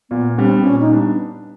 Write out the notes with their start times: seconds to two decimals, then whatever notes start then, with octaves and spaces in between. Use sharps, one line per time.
0.10 A#2 B3
0.37 G3 B3 C4 D4
0.63 A#2 C#4
0.80 D#4
0.89 G3 B3 D4